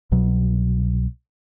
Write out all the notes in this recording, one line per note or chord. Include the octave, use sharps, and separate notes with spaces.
C2 B2 F#3